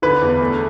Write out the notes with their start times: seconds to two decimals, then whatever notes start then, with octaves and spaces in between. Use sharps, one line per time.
0.02 D3 B4
0.21 E2
0.41 A3